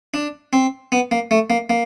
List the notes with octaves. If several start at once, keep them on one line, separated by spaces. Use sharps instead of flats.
D4
C4
B3
A#3
A3
A#3
A#3